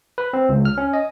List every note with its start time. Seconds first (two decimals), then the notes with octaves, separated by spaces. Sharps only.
0.18 B4
0.33 C4
0.49 C#2
0.65 F6
0.78 C#4
0.93 D#5